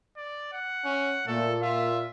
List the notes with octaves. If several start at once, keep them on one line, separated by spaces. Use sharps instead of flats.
D5
F#5
C#4
A#2 A3 A4
F4 E5